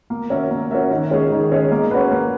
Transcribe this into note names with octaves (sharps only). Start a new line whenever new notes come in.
A#3
C#4 F#4 A#4 E5
A#3
C#4 F#4 A#4 E5
D#3
G#3 C#4 G#4 C#5
D#3
G#3 C#4 G#4 C#5
A#3
C#4 F#4 B4
A#3